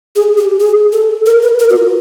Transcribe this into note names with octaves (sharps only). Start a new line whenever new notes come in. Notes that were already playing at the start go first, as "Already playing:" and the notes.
G#4
G4
G#4
A4
A#4
B4
A#4
F#4
F4